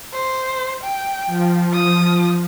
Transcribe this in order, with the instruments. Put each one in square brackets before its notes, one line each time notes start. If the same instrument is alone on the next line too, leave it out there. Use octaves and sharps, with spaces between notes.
[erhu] C5
G5
[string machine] F3
[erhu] D#6